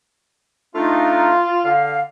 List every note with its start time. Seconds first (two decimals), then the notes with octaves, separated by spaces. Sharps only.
0.75 A3 D4 D#4 F4
1.65 D3 F5